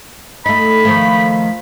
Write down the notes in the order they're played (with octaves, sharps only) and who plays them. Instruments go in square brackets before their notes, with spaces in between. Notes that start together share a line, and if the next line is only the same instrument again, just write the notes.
[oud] A3 D#4 [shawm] B5
[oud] D#3 F3 A3